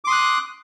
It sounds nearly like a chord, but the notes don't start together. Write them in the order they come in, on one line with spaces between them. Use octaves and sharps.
D6 C6 D#6 F#6